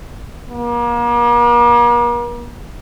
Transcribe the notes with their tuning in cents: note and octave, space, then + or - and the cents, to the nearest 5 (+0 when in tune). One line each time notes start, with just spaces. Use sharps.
A#3 +40